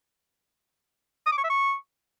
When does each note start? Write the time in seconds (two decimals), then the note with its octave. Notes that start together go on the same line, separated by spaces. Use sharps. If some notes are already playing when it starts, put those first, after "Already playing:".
1.26 D#6
1.32 D6
1.38 C#6
1.44 E5
1.50 C#6